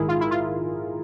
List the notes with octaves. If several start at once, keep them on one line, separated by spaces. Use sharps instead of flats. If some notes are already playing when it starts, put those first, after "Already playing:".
Already playing: A#1 G#2 D#3 E4 G#4 A#4
F4
E4
F4